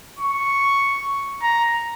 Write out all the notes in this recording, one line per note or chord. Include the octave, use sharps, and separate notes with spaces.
C#6
A#5